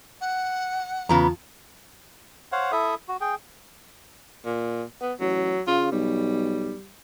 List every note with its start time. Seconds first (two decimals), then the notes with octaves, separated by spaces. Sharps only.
0.20 F#5
1.09 E2 C#3 B3 F4 A5 A#5
2.52 C5 C#5 F5 F#5
2.72 E4 A4 E5 D#6
3.08 F#4
3.21 G#4 G5
4.45 A#2
5.01 B3
5.20 A1 F#3
5.67 C#3 F4
5.92 B1 G3